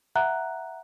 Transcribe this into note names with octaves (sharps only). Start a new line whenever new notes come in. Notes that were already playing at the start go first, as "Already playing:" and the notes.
E5 F#5 A#5 F#6